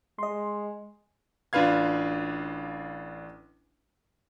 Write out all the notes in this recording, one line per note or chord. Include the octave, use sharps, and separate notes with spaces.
G#3 D#5 C6
A1 D4 F4 B4 F5 G#6